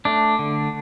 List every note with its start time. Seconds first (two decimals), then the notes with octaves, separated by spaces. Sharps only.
0.05 A3 D4
0.39 D3